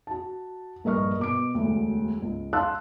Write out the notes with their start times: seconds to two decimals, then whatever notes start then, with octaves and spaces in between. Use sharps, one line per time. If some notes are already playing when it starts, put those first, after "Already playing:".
0.07 F#4 A5
0.84 A#1 G2 A#4 D#5 C#6 F6
1.19 B2 D6 D7
1.55 E1 D2
2.22 C#2
2.53 F5 A5 C6 E6 F#6